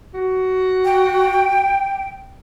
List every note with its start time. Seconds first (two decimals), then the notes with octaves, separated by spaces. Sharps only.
0.14 F#4
0.84 G5